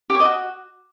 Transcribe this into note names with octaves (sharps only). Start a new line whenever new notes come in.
G4
C#5
D#5
F#4